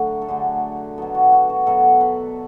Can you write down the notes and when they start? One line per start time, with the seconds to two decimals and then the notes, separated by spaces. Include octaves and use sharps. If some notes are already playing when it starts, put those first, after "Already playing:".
Already playing: D3 F#3 A3 F#4
0.22 A4
0.28 D3 F#3 A3 G#4
0.98 B2 F#3 B3 A4
1.15 F#4
1.32 F#4
1.50 F#4
1.67 B2 F#3 B3 A4
2.01 B4